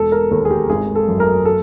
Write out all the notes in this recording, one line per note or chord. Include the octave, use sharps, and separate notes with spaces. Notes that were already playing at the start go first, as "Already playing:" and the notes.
Already playing: E1 A4
A#4
D#2 A4
G#4
G4
G#1 G#4
A4
F#2
A#4
A4